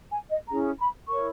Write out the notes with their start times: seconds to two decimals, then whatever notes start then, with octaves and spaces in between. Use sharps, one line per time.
0.11 G#5
0.30 D#5
0.49 C#4 E4 G#4 A#5
0.78 B5
1.08 E4 A#4 C#5 C#6